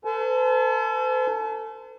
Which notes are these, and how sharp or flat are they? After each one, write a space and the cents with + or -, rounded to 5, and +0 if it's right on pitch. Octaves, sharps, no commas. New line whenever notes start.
A4 +35 C5 -45 A5 -45